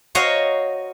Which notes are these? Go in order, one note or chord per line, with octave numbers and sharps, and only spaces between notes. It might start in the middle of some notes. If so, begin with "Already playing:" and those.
F#4 C5 C#5 D#5 F5 A#5